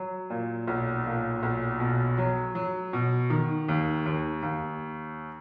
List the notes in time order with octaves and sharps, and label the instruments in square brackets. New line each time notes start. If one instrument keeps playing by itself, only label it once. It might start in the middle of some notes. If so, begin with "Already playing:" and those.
Already playing: [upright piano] F#3
A#2
B1
A#2
B1
B2
F#3
F#3
B2
D#3
D#2
D#2
D#2